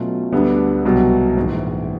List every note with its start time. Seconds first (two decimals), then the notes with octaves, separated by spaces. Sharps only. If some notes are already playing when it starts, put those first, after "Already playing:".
Already playing: B2 F#3 A3 C#4 F4
0.32 D2 D3 G3 B3 D4
0.85 C2 B2 F#3
1.37 A#1 G#2 E3